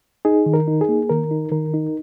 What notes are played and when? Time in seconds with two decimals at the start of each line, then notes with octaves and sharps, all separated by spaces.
0.25 D#4 G#4
0.46 D#3
0.54 A#4
0.68 D#4
0.81 G#4
0.89 A#3
1.10 D#3 A#4
1.31 D#4
1.52 D#3 A#4
1.74 D#4